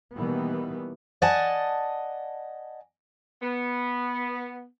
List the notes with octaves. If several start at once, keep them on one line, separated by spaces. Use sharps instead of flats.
B2 D#3 E3 G3 A#3 B3
D5 D#5 F#5 G#5 A5
B3